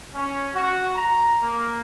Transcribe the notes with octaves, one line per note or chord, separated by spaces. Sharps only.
C#4
F#4
A#5
A#3